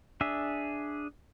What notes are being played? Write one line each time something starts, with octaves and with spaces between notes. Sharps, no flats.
D4 G#4 E5